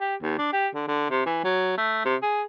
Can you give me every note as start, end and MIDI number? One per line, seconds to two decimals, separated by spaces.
0.01 0.15 67
0.22 0.38 39
0.38 0.48 62
0.53 0.68 67
0.75 0.86 50
0.88 1.10 50
1.10 1.23 48
1.26 1.42 52
1.44 1.77 54
1.78 2.01 57
2.05 2.16 48
2.22 2.42 68